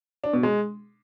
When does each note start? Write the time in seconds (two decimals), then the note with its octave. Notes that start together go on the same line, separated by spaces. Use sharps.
0.24 D4
0.33 B2
0.43 G#3